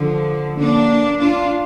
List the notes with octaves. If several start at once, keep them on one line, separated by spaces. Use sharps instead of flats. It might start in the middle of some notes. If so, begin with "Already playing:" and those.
Already playing: D3 F3
A#3 D4
D4 F4